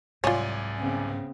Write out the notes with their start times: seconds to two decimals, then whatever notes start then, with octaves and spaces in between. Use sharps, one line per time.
0.24 C2 G#2 C3 F#3 F4 C#5 D5 G#5
0.79 C#3 B3 C4